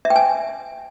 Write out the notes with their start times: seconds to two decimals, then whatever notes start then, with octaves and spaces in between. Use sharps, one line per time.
0.05 E5
0.10 G5
0.16 G#5